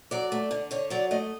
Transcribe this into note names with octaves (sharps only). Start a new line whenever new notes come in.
F#3 D5
A3
D3
D3 C#5
F#3 D5
A3 D#5